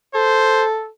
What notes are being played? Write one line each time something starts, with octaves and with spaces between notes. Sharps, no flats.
A4 C5